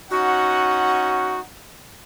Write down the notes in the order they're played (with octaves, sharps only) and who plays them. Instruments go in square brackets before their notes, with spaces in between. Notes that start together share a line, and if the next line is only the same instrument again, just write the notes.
[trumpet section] C#4 D#4 F#5 [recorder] F#4